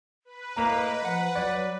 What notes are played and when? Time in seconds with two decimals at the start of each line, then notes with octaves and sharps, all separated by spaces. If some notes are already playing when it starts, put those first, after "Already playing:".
0.25 B4
0.56 A2 A#3 D#5 A#5
1.05 F3 F#5
1.35 F#3 D5